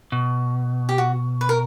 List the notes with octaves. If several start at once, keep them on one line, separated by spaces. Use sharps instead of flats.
B2
G4
F#4
B4
A#4